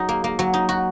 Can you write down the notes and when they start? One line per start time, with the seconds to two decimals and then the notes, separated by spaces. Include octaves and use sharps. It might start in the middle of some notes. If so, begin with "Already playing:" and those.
Already playing: F#3 D#4
0.09 A#3
0.24 A#3
0.39 F#3
0.54 D#4
0.69 F#4